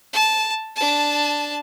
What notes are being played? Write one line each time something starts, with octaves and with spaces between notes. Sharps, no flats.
A5
D4 A5